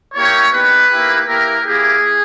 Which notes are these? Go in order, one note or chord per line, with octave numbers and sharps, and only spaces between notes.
A#3 E4 G4 C#5
B3 D#4 G4 B4
A#3 E4 G4
A#3 E4 G4 A#4
A#3 E4 G4 G#4